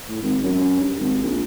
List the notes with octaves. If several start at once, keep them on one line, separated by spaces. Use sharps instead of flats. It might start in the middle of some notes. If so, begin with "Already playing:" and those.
A2
G#1
F#2
G2
G#1
A#1